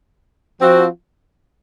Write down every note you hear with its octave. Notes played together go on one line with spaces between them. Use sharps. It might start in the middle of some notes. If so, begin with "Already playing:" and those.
F3 C4 F#4